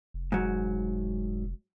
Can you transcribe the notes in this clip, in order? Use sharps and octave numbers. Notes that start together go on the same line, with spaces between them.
F1
G#2 F#3